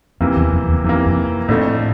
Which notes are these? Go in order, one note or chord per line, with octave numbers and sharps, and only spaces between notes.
F2 C3 E3 A#3
E2
F2
E2
F2 C3 E3 A#3
F2
F2 A2 D3 A3